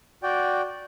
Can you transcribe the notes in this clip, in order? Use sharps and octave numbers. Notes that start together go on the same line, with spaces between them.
F#4 D5 G5